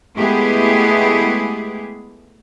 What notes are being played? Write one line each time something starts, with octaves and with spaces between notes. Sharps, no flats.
G#3 A3 B3 E4 G4 G#4